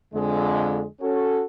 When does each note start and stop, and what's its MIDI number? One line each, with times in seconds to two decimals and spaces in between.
0.14 0.84 41
0.14 0.84 50
0.14 0.84 56
1.01 1.43 61
1.01 1.43 66
1.01 1.43 69